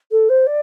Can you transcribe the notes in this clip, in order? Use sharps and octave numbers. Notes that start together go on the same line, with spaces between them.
A4
C5
D5